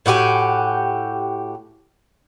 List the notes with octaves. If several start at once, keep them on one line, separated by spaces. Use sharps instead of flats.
A2 F#4 G4 G#5